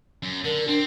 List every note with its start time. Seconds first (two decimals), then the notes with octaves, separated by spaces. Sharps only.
0.23 F#2
0.45 D3 A#4
0.68 C4 D4